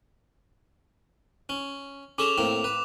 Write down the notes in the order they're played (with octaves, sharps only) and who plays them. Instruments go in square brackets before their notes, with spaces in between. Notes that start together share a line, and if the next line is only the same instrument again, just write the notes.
[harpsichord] C#4
[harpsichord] C#4 G#4 A4 [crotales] D6 E7 F7
[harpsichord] A2 A#3 C4
B4